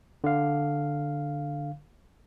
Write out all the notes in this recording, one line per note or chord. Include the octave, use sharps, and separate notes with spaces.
D3 F5